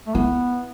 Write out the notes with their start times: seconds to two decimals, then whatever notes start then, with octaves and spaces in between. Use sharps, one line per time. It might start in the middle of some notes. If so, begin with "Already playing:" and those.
0.07 A3
0.14 B3 E4